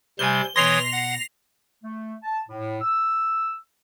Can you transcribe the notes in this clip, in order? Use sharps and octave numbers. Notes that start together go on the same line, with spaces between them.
C3 G3 C5 G#5 G7
B2 E3 C#5 C6 D#6 A#6 C7 F7
F#5
A3
A5
A2
E6